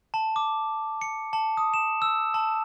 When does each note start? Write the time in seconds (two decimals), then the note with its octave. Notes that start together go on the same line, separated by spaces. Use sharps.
0.14 A5
0.36 D6
1.01 C#7
1.33 A5
1.57 D#6
1.74 E7
2.02 E6
2.34 A5